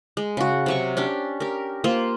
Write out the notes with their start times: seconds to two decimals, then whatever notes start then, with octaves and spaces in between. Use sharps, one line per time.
0.17 G#3
0.37 C#3 F#4
0.66 C3 F#3 C#6
0.97 C#4 D4 G4
1.40 G4 A#4
1.84 A#3 F4 C5